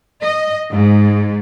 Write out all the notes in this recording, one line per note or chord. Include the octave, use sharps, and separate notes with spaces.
D#5
G#2